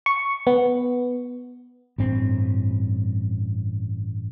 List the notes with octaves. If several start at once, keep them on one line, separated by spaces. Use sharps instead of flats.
C#6
B3
A1 G2 C4